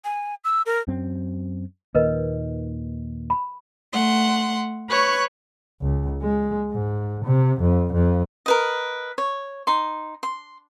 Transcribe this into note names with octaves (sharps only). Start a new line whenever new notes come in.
G#5
E6
A#4
F#2 F#3 C4
D#2 A#2 D#3 A#4 B4 D#5
B5
A3 F#5 C6
B4 C#5 C#6 F#6
C#2
G#3
G#2
C3
F2
F2
A#4 B4 D#5
C#5
D#4 C6
C6